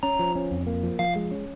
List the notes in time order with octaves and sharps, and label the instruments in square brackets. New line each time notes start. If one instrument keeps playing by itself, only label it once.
[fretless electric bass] C#4 [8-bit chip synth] A#5
[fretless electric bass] F3
C#4
F2
A#3
F3
[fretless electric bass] F3 [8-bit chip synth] F5
[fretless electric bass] G#3
C#4